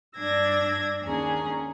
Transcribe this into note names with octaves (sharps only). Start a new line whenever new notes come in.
G2 D4 D5 E6 G#6 A#6
D#2 C#4 D4 G#4 A#5